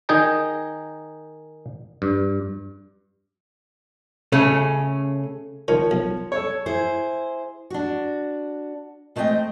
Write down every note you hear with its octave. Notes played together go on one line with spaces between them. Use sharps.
D#3 D#4 G#4 D#5 G5 A#5
G2
C#3 A3 C#4
D#3 F3 C#5
B1
A4 C#5
E4 G#4 C5
D4 F#4
G#3 A3 C4 D5 D#5 G5